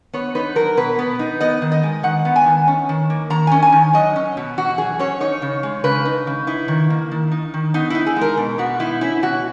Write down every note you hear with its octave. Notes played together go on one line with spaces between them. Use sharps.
B3 C#5
D#4 B4
F#3 A#4
B2 B4
B3
D#4
B3 D#5
D#3
D#5
G#3
D#3 F#5
B3
G#5
D#3
C#4
D#3
A#3
D#3 A#5
C#4 G#5
G#5
D#3
F#3 D#5
C#4
B2
E2 F#4
F#3 G#4
C#4 C#5
D#4 C#5
C#3
G#3
C#3 B4
D#4
C#3
D#4 E4
D#3
A#3
D#3
D#4
D#3
B3 D#4
D#4 E4
G#4
G#3 A#4
B2
B3 F#4
D#4 E4
C#4 E4
B2 F#4